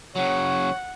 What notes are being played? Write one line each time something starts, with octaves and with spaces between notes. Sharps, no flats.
C#3 F#3 C#5 F#5